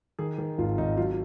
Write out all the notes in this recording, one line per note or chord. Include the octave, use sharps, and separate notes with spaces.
D#3 G#4
D#3
G#1 F4
G#1 D#4
F#3 F4